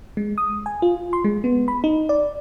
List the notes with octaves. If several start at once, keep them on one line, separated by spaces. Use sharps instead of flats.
G#3
D#6
G#5
F4
C6
G#3
B3
B5
D#4
D5